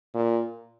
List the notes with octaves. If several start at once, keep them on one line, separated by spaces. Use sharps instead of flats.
A#2